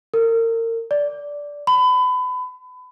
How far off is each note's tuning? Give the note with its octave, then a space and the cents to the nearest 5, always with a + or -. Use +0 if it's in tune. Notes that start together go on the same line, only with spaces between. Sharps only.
A#4 -35
D5 -10
B5 +30